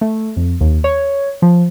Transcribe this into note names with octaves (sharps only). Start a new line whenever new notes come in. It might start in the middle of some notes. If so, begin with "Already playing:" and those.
A3
F2
D#2
C#5
F3